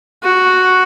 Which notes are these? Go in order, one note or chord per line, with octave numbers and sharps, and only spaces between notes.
F#4